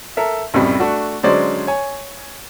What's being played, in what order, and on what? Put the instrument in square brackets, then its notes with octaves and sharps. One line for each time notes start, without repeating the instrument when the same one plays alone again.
[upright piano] A4 A#4 E5
B1 F#2 A2 C3 G3
A3 D4 F#4
D3 F#3 G#3 C#4 C5 D5
C#5 G#5